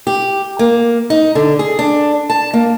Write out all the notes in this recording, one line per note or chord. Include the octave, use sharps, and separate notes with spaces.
G4
A#3
D#4
D3
G#4
D4
A5
A#3